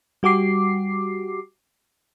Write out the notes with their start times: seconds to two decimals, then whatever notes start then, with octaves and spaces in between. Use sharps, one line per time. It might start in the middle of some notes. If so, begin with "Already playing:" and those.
0.23 G3 F#4 G4 D6 C7